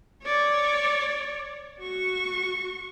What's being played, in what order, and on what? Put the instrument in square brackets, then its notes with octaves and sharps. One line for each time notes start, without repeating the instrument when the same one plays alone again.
[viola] C#5 D5
F#4 C#6